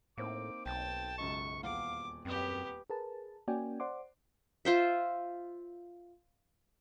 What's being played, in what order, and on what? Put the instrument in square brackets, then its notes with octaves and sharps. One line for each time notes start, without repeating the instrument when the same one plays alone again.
[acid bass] A2 [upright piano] A#3 C4 D#4 [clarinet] D6
[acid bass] B1 [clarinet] G5 [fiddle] A5
[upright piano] C#2 F#2 D#5 [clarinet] C#6
[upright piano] D#1 E2 F#5 [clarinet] F5 [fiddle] D6
[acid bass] F#2 [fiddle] B3 G4 [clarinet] C4
[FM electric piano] G#4 A#4 B4 A5
A#3 C#4 F#4 D5 G5 G#5
C5 D5 F#5 C6 D6
[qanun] F4 C5 E5